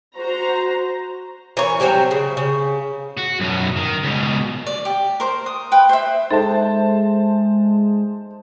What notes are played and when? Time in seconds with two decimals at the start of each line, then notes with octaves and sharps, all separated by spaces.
0.17 F#4 C5 A#5
1.57 E3 A#4 C#5
1.80 C3 F#3 G3 C4
2.11 C#3
2.37 C#3
3.17 F#4
3.40 F#2 B2
3.76 D#3
4.03 C#2 B2
4.66 D5
4.85 G4
5.20 A#4 C5
5.46 D#6
5.72 B4 G5
5.89 C5 E5
6.31 G#3 D#4 A4 C5 E5 A5